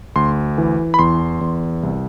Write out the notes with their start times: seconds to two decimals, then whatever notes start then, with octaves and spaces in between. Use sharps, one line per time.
0.16 D2 C6
0.58 E3
0.94 B5
0.99 E2 C6
1.41 E2
1.83 C2